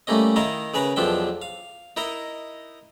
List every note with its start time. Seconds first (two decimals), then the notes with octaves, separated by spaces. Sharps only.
0.07 G3 A3 A#3 C#4 D#5
0.36 D#3 E4 A#4 D#5 F5
0.74 C#3 G#4 A#4 B4
0.96 B1 E2 F3 D4 E5 G5
1.42 F5
1.97 D#4 E4 A#4 D#5